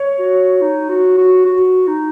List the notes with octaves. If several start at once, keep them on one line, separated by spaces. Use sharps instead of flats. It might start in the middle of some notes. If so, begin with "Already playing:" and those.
Already playing: C#5
F#4
D#4
F#4
F#4
F#4
D#4